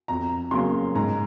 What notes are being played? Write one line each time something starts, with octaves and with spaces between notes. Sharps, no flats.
F2 A#5
C#3 F#3 A#3 C#4 C6
G#2 A#5